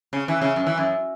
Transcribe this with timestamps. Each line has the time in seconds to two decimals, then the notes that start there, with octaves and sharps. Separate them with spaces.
0.13 C#3
0.28 E3
0.42 C#3
0.56 F#2
0.67 E3
0.78 F#2